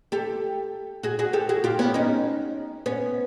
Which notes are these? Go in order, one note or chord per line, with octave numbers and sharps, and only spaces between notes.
G4 A4
F#4 G#4
F#4 G#4
G4 A4
F#4 G#4
F4 G4
B3 C#4
C#4 D#4
B3 C#4